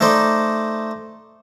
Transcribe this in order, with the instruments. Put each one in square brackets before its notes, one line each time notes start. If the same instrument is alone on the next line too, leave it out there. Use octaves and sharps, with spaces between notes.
[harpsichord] A3 D#4 C5 D5